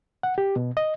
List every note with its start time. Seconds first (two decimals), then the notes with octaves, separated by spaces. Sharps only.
0.23 F#5
0.38 G4
0.56 B2
0.77 D#5